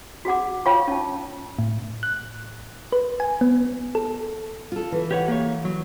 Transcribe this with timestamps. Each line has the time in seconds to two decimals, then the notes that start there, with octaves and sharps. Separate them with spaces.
0.25 F#4 G#4 F#5 D6
0.66 F4 C#5 F5 G5 C#6
0.88 C#4 A5
1.59 A2
2.03 F#6
2.92 B4
3.20 G#5
3.41 B3
3.95 A4
4.72 F4 A4
4.92 E3
5.11 G4 C#5 F#5
5.28 A#3 G4 C#5
5.65 F#3